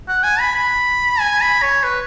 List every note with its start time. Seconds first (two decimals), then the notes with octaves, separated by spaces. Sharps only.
0.08 F#5
0.23 G#5
0.40 B5
0.55 B5
1.19 G#5
1.41 B5
1.62 C#5
1.83 B4